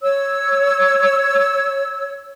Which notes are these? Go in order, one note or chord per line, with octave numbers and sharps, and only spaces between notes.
C#5 E6